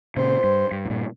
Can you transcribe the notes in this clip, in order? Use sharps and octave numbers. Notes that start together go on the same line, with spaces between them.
A#2 C#3 C5
G2
G2
G#2
G2 A#2